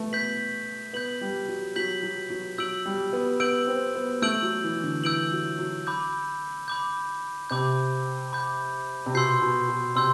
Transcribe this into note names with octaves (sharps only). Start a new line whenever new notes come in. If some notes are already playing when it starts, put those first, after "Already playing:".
Already playing: A3 B3
B3 G6 B6 F#7
B3 G6 B6 F#7
G3
F#3
F#3 G6 B6 F#7
F#3
F#3
F#3 E6 G6 D7 F#7
G3
B3
B3 E6 G6 D7 F#7
C4
B3
A3 E6 G6 D7 F#7
F#3
E3
D3
E3 E6 G6 D7 F#7
F#3
F#3
B5 D6 G6
B5 D6 G6
C3 B5 D6 G6
B5 D6 G6
C3
B2 C6 E6 G6 C7
B2
B2
C3 C6 E6 G6